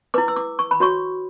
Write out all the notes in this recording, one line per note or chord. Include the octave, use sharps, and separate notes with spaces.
E4 B4 D6
E6
D6
C#6
B5
F#4 C#5 C#6